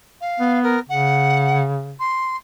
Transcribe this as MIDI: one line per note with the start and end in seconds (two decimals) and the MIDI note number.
0.21 0.59 77
0.40 0.77 59
0.63 0.79 70
0.89 1.97 49
0.89 1.63 78
2.00 2.36 84